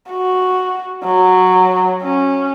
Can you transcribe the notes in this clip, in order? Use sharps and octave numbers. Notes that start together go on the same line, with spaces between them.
F#4
F#3
C#4